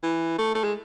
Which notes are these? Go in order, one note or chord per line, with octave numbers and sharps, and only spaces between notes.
E3
A3
A3
G#3